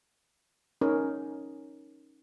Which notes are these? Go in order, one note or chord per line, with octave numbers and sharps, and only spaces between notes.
C#4 D#4 G#4 A#4